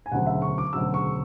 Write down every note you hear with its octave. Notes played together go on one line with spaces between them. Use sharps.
G#5
E1 D2 C#3 F#3 F#5
E5
C#6
D6
E1 D2 C#3 F#3 E6
C#6